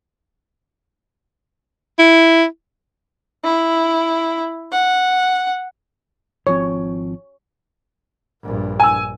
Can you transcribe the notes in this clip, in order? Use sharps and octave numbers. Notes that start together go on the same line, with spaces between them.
E4
E4
F#5
G#1 F3 C4 C#5
A#1 G2
G#5 E6